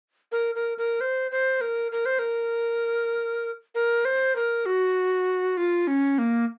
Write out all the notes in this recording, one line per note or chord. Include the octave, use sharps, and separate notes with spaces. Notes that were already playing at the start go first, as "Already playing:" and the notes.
A#4
A#4
A#4
C5
C5
A#4
A#4
C5
A#4
A#4
C5
A#4
F#4
F4
C#4
A#3